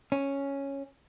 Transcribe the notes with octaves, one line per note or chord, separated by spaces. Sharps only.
C#4